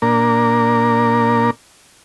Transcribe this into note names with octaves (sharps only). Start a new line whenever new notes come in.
A#2 A#3 D4 A#4